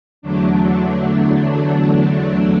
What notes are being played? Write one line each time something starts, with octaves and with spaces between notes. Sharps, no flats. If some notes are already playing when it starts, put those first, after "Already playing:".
E2 D3 F#3 A3 D4